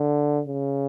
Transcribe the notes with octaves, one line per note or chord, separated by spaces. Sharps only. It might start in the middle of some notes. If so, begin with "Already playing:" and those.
Already playing: D3
C#3